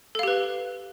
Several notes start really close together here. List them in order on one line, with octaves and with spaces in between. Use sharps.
A4 F5 G4 B4